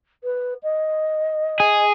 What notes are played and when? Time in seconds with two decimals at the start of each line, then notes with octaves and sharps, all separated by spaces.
0.24 B4
0.63 D#5
1.60 G#4